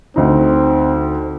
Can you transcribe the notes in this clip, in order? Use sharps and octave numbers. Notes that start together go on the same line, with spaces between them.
D2 C4 D#4